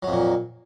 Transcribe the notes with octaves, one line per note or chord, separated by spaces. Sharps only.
F2 A#2 F#3